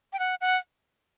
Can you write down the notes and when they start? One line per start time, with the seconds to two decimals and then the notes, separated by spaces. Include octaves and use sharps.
0.13 G5
0.19 F#5
0.41 F#5